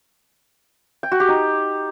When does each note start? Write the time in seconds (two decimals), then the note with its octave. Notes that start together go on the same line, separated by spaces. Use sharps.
1.03 G5
1.12 F#4
1.20 G4
1.28 D#4